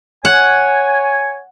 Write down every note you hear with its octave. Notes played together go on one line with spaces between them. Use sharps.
C#5 F#5 G#5